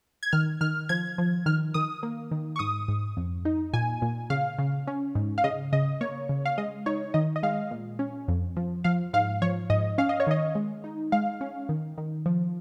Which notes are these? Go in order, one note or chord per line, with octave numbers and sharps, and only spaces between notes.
G#6
D#3 F6
D#3 F6
F3 G#6
F3
D#3 F6
D#3 D#6
A#3
D#3
C#6
G#2 D#6
G#2
F2
D#4
A#2 G#5
A#2
C#3 F5
C#3
C#4
G#2
F5
C#3 D#5
C#3 D#5
A#3 C#5
C#3
F5
G#3 D#5
D#4 C#5
D#3 D#5
D#5
G#3 F5
A#2
C#4
F2
F3
F3 F5
G#2 F5
F3 C#5
G#2 D#5
C#4 F5
D#5
C#5
D#3 D#5
G#3
D#4
G#3 F5
C#4
D#3
D#3
F3